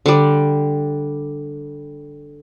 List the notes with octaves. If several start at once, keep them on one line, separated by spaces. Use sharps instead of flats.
D3 G3